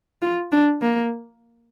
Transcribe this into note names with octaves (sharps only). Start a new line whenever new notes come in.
F4
D4
A#3